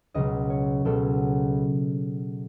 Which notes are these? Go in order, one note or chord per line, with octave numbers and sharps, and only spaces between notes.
C#2 B2 F#3 D#5
C#5
C#2 B2 F#3 A4